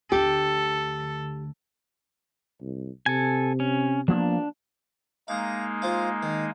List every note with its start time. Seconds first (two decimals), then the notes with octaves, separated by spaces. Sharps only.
0.12 D2 D3 G4 A4
2.61 C2
3.06 C3 A4 G#5
3.60 C#4
4.08 F3 A#3 B3 D4
5.28 G#3 A#3 D#4 F5 A#5
5.82 F4 C5 F5
6.23 D#3